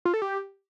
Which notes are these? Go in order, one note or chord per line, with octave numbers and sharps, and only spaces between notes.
F4
A4
G4